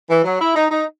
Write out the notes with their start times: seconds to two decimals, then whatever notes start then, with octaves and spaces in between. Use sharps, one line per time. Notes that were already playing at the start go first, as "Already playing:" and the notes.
0.09 E3
0.24 F#3
0.39 E4
0.55 D#4
0.71 D#4